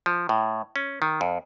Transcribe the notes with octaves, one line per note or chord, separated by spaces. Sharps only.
F3
A2
C#4
D#3
F2